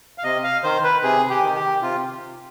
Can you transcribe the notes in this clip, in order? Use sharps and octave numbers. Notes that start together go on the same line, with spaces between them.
F5
C3 D#5
F5
D#3 C5
B4
C3 G#4
G4
D#3
G4
C3 F4